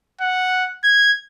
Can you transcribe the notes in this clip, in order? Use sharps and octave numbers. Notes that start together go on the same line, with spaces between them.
F#5
G#6